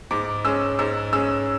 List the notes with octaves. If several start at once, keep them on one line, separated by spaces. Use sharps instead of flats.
G#2 D6
G#3 C#4 E6
G#2 E6
G#3 C#4 E6